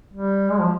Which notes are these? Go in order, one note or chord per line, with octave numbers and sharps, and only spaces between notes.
G3
G#3
F3